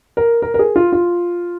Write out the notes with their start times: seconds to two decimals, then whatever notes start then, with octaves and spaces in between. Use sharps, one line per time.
0.17 A#4
0.42 A#4
0.54 A#4
0.59 G#4
0.76 F4
0.93 F4